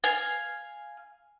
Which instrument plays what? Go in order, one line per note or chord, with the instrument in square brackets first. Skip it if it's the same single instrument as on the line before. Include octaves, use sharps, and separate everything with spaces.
[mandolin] F5 G#5